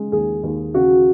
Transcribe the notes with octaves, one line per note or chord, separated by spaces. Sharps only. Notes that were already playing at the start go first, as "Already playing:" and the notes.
Already playing: C#3 G#3
D#2 G#4
D#2
C#3 F#4